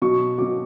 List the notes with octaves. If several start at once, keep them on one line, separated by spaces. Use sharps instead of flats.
B2 F#3 C#6
B2 F#3 D6